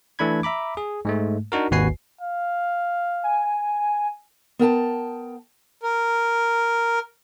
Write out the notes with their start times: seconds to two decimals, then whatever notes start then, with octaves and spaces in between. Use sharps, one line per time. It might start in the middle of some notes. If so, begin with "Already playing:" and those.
0.19 E3 A3 D4 B5 G#6
0.43 E5 A#5 B5 D6
0.77 G#4
1.05 G#2 G#3 A3
1.52 D4 D#4 F#4 A#4
1.71 G#1 D#2 F#4 B4 G#5 C7
2.21 F5
3.24 G#5
4.59 B3 A#4 G5 A5
5.83 A#4